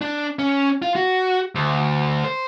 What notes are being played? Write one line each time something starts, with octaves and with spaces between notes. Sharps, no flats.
D4
C#4
F4
F#4
D2
C5